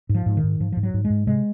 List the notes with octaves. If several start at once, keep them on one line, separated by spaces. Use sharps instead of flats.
G#2
F3
G#2
D#3
G#2
G#2 F3
G#2 F3
F#3
G#2
G#3
G#2
C3 G#3